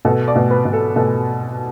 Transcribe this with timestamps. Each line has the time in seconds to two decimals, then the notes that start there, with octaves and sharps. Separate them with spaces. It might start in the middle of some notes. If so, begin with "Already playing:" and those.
0.05 B2 A4
0.28 D5
0.35 B2
0.51 B4
0.65 B2
0.73 A4
0.96 B2 A4